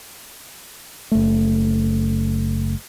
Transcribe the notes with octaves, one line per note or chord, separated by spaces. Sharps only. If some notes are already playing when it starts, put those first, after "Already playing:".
F#1 A3